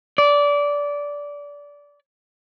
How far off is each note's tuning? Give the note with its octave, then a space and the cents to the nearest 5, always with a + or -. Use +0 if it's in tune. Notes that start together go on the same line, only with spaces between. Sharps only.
D5 -20